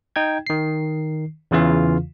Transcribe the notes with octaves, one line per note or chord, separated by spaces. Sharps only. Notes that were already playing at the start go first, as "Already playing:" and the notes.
D#4 G5 G#6
D#3 C7
E2 C#3 E3 F4 F5